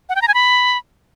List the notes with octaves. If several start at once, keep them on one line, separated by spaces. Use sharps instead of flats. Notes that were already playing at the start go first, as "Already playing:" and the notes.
F#5
G5
A#5
G#5
B5